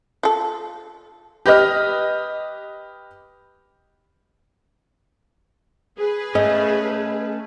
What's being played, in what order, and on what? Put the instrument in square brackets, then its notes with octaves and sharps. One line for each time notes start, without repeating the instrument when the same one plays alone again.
[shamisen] F4 A4
[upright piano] G4 B4 D#5 F6
[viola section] G#4 B4
[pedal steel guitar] A3 C#4 [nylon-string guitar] D#5